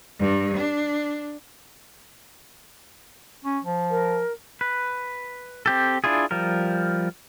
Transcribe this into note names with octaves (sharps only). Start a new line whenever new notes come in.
G2
D4
C#4
F3
A#4
B4
C4 G4 A4
D4 E4 F4 G#4
F3 G3 A#4